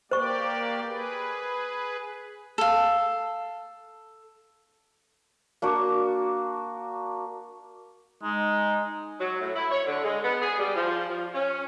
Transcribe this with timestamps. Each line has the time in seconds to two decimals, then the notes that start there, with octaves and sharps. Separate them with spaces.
0.11 A#3 G4 C5 D5 C#6
0.86 G#4 B4
2.58 A4 F5
5.62 A#3 D4 F#4
8.23 G#3 D#4
9.20 F#3
9.41 A2
9.56 E4
9.71 C#5
9.86 D3
10.04 G#3
10.24 B3
10.41 G#4
10.59 G3
10.76 F3
11.09 F3
11.34 C#4